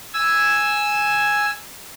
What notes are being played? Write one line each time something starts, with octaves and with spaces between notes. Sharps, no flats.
G#5 E6